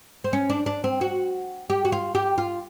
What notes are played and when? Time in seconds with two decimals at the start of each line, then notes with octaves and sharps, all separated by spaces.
0.24 C4
0.33 C#4
0.50 D4
0.66 D4
0.84 C4
1.01 F#4
1.70 G4
1.85 F#4
1.92 F4
2.15 G4
2.38 F4